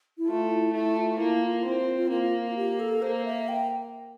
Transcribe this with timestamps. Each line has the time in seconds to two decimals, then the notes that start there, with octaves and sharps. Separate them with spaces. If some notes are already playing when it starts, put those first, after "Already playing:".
0.18 E4
0.27 A3 F4
0.51 E4
0.73 A3 E4
0.96 F4
1.19 A#3 E4
1.42 F4
1.65 C4 E4
1.80 F4
1.96 F4
2.11 A#3 F4
2.22 F4
2.45 F4
2.56 G4
2.79 A4
3.02 A#3 C5
3.25 E5
3.48 G5